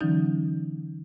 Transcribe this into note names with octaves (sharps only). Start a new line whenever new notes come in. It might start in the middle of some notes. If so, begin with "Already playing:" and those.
D3 E3 F#3 C#4 D#4